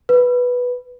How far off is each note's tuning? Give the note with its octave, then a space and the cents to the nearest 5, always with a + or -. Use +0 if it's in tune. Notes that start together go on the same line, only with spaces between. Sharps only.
B4 -5